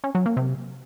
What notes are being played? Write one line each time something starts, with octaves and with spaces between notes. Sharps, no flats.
C#4
F#3
A#3
C3